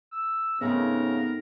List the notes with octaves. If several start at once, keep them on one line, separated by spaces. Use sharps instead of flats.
E6
G#2 C#3 A3 B3 C4 A#4